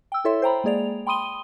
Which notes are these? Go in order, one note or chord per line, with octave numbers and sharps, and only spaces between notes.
G5 E6
E4 A4 C#5 E5 C6
C5 G5 A#5 B5
G#3 A#3 G#4 D5 F7
G5 B5 C6 D#6 D#7 G7